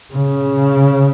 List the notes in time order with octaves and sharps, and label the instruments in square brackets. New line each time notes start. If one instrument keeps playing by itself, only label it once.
[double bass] C#3